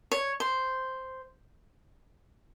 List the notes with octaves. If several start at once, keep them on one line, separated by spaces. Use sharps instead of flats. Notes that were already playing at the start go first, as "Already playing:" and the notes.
C#5
C5